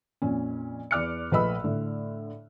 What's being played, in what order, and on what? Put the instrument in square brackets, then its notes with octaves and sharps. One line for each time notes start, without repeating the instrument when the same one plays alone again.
[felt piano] F2 A#2 C#4
E2 D5 D6 F6 F#6 C#7
A#1 A3 B4 D#5 B5 E6
A2 D3